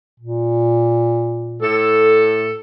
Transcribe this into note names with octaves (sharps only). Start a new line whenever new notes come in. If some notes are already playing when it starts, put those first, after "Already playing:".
A#2
A2 A4